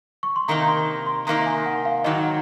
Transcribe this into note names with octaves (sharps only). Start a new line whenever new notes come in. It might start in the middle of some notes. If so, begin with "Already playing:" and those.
C#6
C6
C3 D#3 A#3 D#4 A#5
C6
C6
C3 D#3 A#3 D#4 A#5
G#5
F#5
F5
G#2 D#3 F#3 D#5